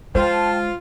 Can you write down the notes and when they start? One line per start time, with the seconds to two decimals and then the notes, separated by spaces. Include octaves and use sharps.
0.15 G#3 F4 C5 G5 A5